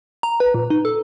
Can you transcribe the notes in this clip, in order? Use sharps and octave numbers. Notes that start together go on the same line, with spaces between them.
A#5
B4
A#2
D#4
A4